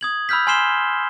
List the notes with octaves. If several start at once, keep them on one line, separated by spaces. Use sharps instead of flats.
D#6 G#6 F#7
B5 E6 F6 G6 B6
G#5 C6 F6 C7 E7 G7